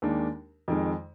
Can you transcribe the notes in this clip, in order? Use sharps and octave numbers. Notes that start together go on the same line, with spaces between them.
D#2 D#3 G#3 D4
F2 D#3 G#3